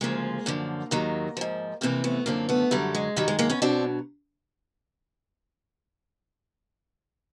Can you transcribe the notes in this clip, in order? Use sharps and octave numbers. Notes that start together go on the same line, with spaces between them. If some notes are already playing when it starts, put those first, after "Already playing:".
D2 C#3 F3 G#3 A#3
F#2 D3 F3
D#2 D#3 F#3
G#2 F3
F2 C3 E3 A#3 C4
A3 B3
F#2 D3 F3 A#3 C4
A3 B3
F#2 D3 F#3 G3 A3
G#3
F#2 D#3 F#3 G3
G#3
G#3 A#3
B3 C#4
B2 F#3 C4 D4